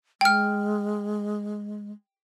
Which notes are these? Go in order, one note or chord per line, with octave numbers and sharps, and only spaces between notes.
G#3 G5 F6